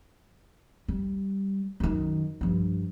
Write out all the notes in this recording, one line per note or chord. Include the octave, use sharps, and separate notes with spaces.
G3
F#2 D#3
G2 F3